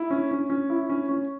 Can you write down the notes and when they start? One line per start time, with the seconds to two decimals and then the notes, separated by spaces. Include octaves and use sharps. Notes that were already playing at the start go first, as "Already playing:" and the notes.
Already playing: E4
0.10 C#4
0.31 C#4
0.50 C#4
0.70 E4
0.89 C#4
1.09 C#4